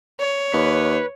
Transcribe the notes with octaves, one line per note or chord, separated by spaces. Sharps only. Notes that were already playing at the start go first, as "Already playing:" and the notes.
C#5
D#2 B4